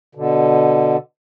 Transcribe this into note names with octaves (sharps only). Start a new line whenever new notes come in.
B2 D3